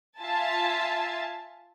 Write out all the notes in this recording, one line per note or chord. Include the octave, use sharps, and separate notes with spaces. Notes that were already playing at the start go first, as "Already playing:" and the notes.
F4 E5 G#5 A5 A6